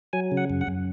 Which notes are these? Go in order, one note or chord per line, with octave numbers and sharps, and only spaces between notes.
F#3 G#5
C#3
F#5
F#2
F#5
F#2